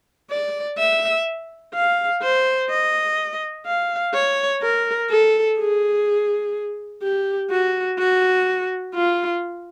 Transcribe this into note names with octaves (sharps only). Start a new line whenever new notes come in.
D5
E5
F5
C5
D#5
F5
C#5
A#4
A4
G#4
G4
F#4
F#4
F4